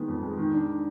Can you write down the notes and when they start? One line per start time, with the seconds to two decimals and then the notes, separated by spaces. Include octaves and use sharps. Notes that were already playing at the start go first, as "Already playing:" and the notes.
Already playing: D#3 G#3 B3
0.08 F2
0.23 G#3
0.37 D#3
0.53 D4